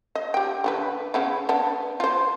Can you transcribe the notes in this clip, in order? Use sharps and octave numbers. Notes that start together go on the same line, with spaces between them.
D#5
G4 G5
D3 F4 B4
C#3 B3 E4
B3 D4
F4 C5